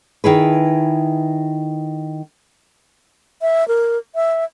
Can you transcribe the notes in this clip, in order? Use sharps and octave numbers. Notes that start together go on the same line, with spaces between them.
D#3 E4 G#4 B4
E5
A#4
E5